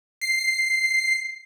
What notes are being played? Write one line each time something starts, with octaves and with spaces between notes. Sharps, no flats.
C7